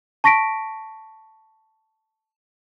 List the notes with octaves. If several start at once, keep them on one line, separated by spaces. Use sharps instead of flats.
A5 C#6 A#6 B6 D7